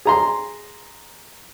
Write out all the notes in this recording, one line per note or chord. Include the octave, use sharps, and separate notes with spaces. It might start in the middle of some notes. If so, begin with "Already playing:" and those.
G#4 A#5 C6